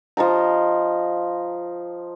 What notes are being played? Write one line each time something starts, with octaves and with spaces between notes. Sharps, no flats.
F3 D#5 A5 A#5